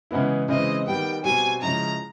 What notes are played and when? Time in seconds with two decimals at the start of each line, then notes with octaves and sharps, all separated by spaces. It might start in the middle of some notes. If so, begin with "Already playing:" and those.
0.11 C#3 E3 G#3 B3 E4
0.49 C#3 E3 G#3 C4 E4 D#5
0.87 D#3 G3 B3 G5
1.25 B2 G3 C4 G#5
1.62 C#3 F3 G#3 C#4 E4 A#5